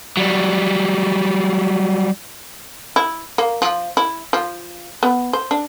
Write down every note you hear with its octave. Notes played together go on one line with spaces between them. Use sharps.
F#3 G3
E4
A#3
F3
E4
F3
B3
C5
D4